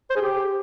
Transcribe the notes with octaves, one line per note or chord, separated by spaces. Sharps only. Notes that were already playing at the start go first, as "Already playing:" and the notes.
C5
G#4
G4